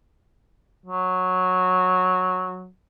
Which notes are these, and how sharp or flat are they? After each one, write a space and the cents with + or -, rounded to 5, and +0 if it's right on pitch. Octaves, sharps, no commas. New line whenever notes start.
F#3 -10